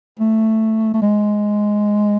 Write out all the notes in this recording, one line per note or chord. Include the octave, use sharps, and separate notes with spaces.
A3
A3
G#3